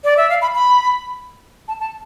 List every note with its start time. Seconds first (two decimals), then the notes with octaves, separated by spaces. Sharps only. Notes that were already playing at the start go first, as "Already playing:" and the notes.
0.04 D5
0.17 E5
0.30 F5
0.42 B5
0.54 B5
1.68 A5
1.80 A5